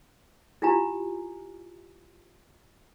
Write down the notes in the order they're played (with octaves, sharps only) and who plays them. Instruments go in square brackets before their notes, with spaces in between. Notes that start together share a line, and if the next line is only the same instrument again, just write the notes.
[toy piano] E4 F4 G4 G#5 A#5